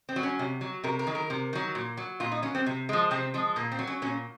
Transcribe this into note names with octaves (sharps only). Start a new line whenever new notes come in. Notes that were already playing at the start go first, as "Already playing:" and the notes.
C4
F#3
C#4
C3
F#3
C3 A#4
A#4
D#3 F#3
A#4
C3
D#3 F#3
A#2
F#3
A#2 F4
D#4
F#3 C#4
C4
C3
F3 G#3
C3 C4
F3 G#3
A#2 A#3
C4
F#3
C#4
A#2 C#4